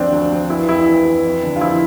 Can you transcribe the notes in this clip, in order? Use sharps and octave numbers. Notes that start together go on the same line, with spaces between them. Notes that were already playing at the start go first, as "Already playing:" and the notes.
Already playing: D2 F3 C4 D4
D2
F3
E3 E4
F2 E4
E3
E3
F2
D3
F4
F3 E4